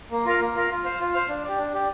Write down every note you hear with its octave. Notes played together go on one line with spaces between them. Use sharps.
A#3
F4 A#4 F5
A#3
F4 A#4 F5
F4
C5 F5
F4
C5 F5
D4
G4 D5
D4
G4 D5